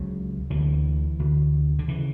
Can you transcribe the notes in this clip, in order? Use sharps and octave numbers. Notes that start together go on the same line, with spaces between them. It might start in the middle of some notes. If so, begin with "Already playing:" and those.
Already playing: C#2 C#3 F#3
D2 D3 E3
D2 D3
D3
C#3 E3